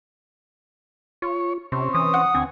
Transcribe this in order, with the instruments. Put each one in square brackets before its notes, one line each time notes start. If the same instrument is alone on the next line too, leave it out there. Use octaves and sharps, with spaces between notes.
[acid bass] F4 [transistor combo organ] C#5
[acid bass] C3 [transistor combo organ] C4 C#4
[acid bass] E3 [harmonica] D#6
[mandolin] F#5
[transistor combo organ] D2 G#5 [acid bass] C4